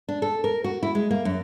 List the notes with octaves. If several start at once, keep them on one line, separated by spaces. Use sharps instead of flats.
D4
A4
A#4
F#4
E4
G#3
A#3
F#2